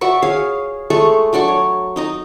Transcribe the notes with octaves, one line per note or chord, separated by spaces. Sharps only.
F#4 D5 E5 C#6
G#4 C#5 F5
G#3 A3 A4 C#6
F#3 D4 D5 C#6
C#5
D#4 D#5 A#5